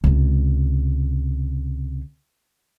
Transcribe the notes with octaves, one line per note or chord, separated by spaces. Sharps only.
C#2 C3